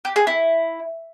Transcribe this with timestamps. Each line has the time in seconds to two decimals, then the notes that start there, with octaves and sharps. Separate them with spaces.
0.05 G4
0.16 G#4
0.27 E4